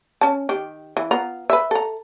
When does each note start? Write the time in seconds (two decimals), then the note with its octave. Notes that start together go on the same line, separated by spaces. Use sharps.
0.21 C#4 A5
0.49 D#3 G4
0.97 E3
1.11 B3 F4 A#5
1.50 B4 E5
1.71 A4 A#5